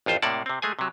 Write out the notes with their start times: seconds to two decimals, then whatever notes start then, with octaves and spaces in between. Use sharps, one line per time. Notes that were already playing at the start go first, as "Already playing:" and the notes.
0.06 A1 F2 F4 C5
0.22 A2 C3 A#3 D5 F#5 A5
0.46 C3 C4
0.62 G#3 A3 G#4 G#5
0.79 C3 F#3